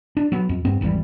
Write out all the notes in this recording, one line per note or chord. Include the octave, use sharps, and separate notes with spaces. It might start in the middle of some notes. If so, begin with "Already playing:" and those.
D4
F#3 B3
F2
G2 B3 C4
G#1 E2 E3 G3